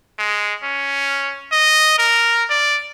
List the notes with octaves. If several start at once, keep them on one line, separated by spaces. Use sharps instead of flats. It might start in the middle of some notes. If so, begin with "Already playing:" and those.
G#3
C#4
D#5
A#4
D5